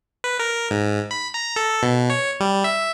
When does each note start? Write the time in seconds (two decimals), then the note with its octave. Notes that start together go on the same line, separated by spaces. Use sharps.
0.24 B4
0.39 A#4
0.71 G#2
1.11 B5
1.34 A#5
1.56 A4
1.83 B2
2.10 C#5
2.40 G3
2.64 E5